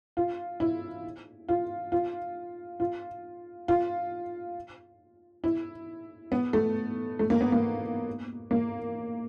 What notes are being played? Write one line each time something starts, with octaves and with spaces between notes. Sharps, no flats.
F4
E4
F4
F4
F4
F4
E4
B3
A3
A3
A#3
B3
A#3
A#3